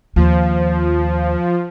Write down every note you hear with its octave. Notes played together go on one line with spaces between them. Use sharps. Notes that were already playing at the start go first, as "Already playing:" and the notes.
D#2 F3